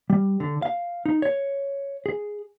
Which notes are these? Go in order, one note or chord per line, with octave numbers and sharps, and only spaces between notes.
G3
D3
F5
D#4
C#5
G#4